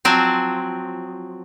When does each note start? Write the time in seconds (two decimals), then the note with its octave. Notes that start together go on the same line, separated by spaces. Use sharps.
0.05 F3 F#3 C4